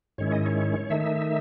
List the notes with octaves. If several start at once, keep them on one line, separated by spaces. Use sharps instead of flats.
G#2 D#3 G#3 C#4 E4 C#5
D#5
C#5
D#3 A3 D#4 E5